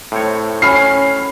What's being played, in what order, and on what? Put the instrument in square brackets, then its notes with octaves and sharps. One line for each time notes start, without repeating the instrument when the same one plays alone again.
[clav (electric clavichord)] A2 C4 C#5
[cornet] C#4 [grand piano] B5 F6 C7